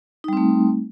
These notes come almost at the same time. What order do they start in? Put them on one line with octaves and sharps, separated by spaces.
D#4 G3 C4 A3